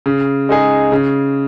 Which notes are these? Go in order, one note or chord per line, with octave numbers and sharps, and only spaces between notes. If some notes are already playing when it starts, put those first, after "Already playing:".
C#3
G#3 D#4 G#4
C#3